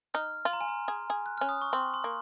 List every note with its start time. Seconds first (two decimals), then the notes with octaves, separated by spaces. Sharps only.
0.14 D#4 F6
0.45 F4 C6
0.53 A#5
0.61 G#5
0.68 A#5
0.88 G#4
1.10 G#4
1.26 F#6
1.38 C#4 F6
1.49 D#6
1.61 C#6
1.73 C4 C6
1.94 C6
2.04 A#3